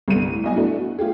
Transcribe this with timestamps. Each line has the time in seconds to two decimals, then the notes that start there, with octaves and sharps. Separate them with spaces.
0.08 C2 G2 D3 B3 D#7
0.32 A2
0.44 B1 G3 D#5 G#5
0.56 A3 B3 D4 E4 F#4
0.79 F#4
0.99 A3 F4 G4 G#4